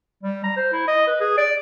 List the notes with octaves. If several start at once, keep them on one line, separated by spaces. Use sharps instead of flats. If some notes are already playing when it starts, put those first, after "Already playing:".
G3
A#5
C5
E4
D#5
B4
G#4
D5